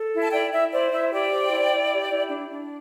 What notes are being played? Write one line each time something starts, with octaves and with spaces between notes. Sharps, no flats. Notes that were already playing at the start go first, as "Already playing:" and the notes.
Already playing: A4
E4
A5
E4 D5 G5
E4 E5
C5 D5
E4 E5
G4 D5 G5
C5
E4
E4
G4
E4
D4
D4